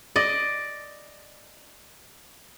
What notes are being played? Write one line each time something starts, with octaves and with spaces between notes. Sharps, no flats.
D5 D#5